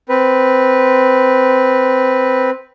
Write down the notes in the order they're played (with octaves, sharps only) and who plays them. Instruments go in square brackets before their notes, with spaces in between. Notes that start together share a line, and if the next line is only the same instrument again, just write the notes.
[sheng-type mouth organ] C4 B4